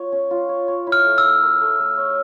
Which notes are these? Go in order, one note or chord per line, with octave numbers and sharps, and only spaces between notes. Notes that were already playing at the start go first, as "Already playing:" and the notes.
Already playing: F4 C#5
C#4
F4
C#5
C#5
E4
F6
A3
E6
A3
A#4
A3
A3
C#5